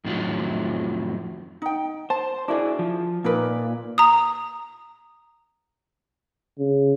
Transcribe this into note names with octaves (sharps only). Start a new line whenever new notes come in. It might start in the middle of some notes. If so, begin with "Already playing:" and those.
F2 A2 D#3 F3 F#3
D#4 G5
C5 A5
D4 E4 F#4 G#4 A#4 D5
F3
A#2 D#4 A#4 B4
A#5 D#6
C#3